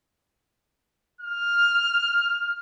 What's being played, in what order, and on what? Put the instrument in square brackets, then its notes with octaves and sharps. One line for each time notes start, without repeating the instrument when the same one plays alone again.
[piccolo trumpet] F6